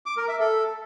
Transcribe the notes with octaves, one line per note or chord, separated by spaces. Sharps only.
D6
A#4
E5
A4